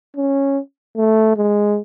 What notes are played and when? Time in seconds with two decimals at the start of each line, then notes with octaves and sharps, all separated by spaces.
0.17 C#4
0.97 A3
1.37 G#3